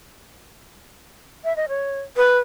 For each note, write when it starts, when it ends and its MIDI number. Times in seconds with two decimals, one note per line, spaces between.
1.44 1.55 76
1.56 1.66 75
1.69 1.99 73
2.17 2.38 71